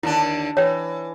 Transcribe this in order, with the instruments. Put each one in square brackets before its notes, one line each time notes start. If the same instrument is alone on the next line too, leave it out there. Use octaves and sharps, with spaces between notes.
[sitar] D#2 D3 D4 [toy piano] E4
[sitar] E3 [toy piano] C#5 G5